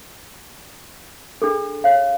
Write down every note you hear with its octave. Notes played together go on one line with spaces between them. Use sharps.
D4 G#4 A4
C#5 F5